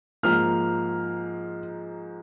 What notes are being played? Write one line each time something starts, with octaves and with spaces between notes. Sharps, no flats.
G#2 F3 A#3 F6